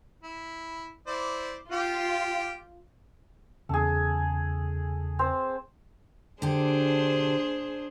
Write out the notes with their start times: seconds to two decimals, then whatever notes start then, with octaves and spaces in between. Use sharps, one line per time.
0.23 E4
1.07 E4 C5 D5
1.72 F4 G4 G5 F6
3.69 E2 C#3 G#4 A4
5.19 C4 C5
6.42 D3 D4 G4 G#4 C5